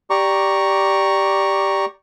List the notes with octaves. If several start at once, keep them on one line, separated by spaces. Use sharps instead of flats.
G4 D5 A#5 C#6